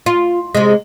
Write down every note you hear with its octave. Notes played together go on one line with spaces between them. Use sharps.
F4
C3 G#3